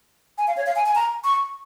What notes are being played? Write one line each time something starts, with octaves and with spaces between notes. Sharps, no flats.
G#5
F5
C#5
F5
G#5
G#5
A#5
C#6